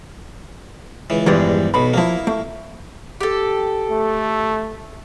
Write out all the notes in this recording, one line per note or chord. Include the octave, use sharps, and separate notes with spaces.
C#2 E3
A#1 E2 G2 E3 G3 G#3
B1 B2 B5
C#2 F3 A#3 E4
A3
G4 A4
A3